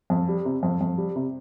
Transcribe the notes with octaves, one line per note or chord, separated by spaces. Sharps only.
F2
G3
C3
F2
F2
G3
C3